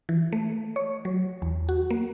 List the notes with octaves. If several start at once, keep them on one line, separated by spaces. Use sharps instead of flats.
E3
A3
C#5
F#3
E2
F#4
A#3